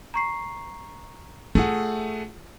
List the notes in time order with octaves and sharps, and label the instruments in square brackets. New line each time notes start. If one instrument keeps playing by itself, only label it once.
[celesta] A#5 C#6 C7
[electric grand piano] A3 G#4 F#5 [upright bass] F4